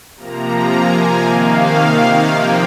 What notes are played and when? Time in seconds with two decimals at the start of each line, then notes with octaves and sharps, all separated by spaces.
0.16 C3 F3 A#3 A#5
0.70 G#5
1.24 C3 D#3 A#3 F5
2.31 C3 F3 A#3 G5